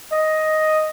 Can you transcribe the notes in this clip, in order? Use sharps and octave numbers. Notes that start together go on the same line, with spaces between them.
D#5